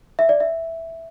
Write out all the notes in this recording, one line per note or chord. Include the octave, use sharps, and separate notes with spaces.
E5
D5
E5